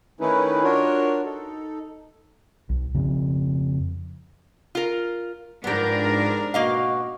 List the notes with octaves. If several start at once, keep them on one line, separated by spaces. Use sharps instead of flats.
D#3 A3 C#4 D#4 E4 B4
D4 F4 F#4 A#4 C#5
D#4 A4
B1
F2 C#3 F3 C4
F4 A#4
G#2 F3 B3 D4 G4 A#4
B2 A#3 F#4 D#5 F5